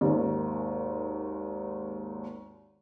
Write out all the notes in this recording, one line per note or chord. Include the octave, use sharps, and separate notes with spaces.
G#1 D#2